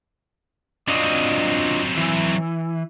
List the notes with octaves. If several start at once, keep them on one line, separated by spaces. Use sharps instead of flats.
F#3 C4 D4 F4 D#5
E3